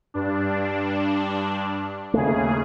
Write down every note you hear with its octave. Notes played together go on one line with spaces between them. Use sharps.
G2 D4
D#2 C#3 A3 G#4